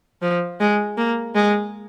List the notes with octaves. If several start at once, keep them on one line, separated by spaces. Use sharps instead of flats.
F3
G#3
A#3
G#3